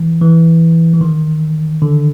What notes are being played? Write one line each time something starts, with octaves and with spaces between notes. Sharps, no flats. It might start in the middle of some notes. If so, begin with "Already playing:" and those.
Already playing: E3
E3
E3
D#3
D3